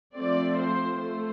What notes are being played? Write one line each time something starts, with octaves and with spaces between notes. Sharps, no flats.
F3 A3 C4 D5
C5
A3 C5